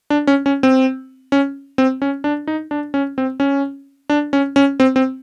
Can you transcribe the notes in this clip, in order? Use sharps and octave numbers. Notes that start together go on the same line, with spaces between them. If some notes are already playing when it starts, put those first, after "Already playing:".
D4
C#4
C#4
C4
C#4
C4
C#4
D4
D#4
D4
C#4
C4
C#4
D4
C#4
C#4
C4
C4